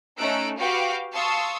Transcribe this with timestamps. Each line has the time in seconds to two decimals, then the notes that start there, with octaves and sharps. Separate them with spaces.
0.17 A3 C#4 D#4 E6 F#6 D7
0.59 F#4 G4 B4 F5 G5 D6
1.12 F5 A5 C6 C#6 D#6 E6